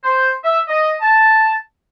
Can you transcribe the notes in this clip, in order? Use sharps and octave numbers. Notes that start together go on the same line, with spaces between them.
C5
E5
D#5
A5